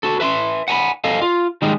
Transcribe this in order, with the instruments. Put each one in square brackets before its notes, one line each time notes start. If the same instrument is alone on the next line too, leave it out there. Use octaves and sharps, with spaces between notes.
[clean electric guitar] F#4 A4
B4 E5 B5 C6
F#5 G#5 A#5 B5
A4 D#5 F5 G#5
F4
D#3 G3 G#3 D#4